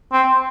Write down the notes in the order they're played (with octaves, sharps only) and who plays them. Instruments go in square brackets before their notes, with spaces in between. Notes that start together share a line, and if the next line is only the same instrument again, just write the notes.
[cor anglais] C4